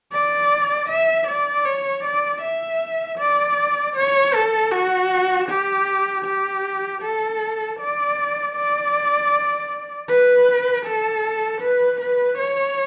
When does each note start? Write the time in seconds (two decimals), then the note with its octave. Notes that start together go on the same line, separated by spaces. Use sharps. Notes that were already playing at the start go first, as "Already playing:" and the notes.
0.12 D5
0.88 E5
1.27 D5
1.65 C#5
2.04 D5
2.42 E5
3.19 D5
3.96 C#5
4.34 A4
4.71 F#4
5.49 G4
6.25 G4
7.02 A4
7.79 D5
8.55 D5
10.08 B4
10.86 A4
11.61 B4
12.00 B4
12.38 C#5